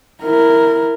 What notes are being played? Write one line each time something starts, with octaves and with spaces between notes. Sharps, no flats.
E4 A#4